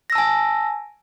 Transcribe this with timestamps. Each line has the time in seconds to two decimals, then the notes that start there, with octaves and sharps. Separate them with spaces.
0.10 A#6
0.12 E6
0.15 A5
0.18 G#5